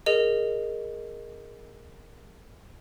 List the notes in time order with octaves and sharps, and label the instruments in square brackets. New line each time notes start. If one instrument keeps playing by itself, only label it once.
[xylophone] G#4 A#4 D#5